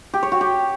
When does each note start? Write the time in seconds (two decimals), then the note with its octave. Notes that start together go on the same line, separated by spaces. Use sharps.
0.14 G4
0.23 C#5
0.32 F#4
0.41 G4